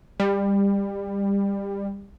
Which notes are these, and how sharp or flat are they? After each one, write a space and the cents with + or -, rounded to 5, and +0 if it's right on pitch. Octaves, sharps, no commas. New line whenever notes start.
G3 +25